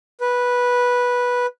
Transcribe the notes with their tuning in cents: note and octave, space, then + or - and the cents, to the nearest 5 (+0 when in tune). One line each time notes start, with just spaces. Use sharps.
B4 -10